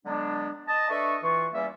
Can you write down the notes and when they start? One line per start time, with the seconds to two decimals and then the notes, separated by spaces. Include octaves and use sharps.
0.05 D3 F#3 G#3 B3 D4
0.67 D#5 A5
0.89 D4 A4 B4 D#5 E5 C#6
1.23 E3 F4 C#6
1.52 E2 G3 A#3 C#4 E5